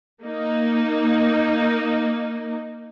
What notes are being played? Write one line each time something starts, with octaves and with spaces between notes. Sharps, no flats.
A#3 D#4